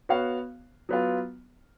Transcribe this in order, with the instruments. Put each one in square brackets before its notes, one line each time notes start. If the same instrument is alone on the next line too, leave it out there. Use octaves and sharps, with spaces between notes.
[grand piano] B3 F#4 C#5 F5
F#3 B3 F4